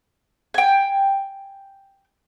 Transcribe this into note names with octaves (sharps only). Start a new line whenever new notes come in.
G5 G#5